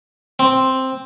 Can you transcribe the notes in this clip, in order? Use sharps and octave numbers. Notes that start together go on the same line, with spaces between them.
C4